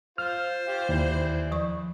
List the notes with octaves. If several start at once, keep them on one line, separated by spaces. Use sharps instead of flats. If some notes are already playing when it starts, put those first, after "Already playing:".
F4 C5 F6
F4 G4
D#2 E3 D5
F3 C#6